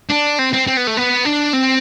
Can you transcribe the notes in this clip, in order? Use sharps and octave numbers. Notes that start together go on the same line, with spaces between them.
D4
C4
C4
C4
B3
A3
B3
D4
C4